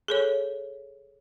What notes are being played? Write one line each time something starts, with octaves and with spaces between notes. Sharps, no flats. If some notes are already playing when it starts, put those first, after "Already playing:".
G#4 A4 C#5